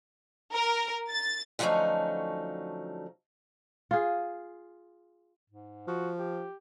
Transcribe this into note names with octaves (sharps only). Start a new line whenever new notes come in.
A#4
A6
D3 F3 F#3 A3 C#4 D#4
F4 G#4
G#2
F3 F#4
G4